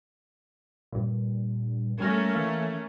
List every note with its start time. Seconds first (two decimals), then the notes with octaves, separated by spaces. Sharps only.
0.92 G2 A#2
2.00 G3 A3 A#3 C#4 F6 A#6
2.35 E3 E5 F5